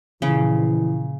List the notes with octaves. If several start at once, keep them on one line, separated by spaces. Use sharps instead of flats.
A#2 C#3 E3 F3